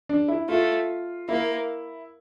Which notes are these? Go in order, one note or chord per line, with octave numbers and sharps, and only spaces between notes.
D4
E4
A3 F4
A#3 E4